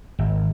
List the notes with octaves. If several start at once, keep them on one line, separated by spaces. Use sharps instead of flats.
G#1